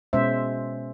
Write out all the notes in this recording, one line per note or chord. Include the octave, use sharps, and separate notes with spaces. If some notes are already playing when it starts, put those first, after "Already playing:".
B2 G#3 C#4 C5 E5